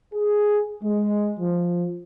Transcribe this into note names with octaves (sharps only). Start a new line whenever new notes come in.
G#4
G#3
F3